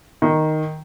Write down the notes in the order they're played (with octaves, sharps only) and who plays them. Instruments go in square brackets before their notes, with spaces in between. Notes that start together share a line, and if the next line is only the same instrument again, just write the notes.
[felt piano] D#3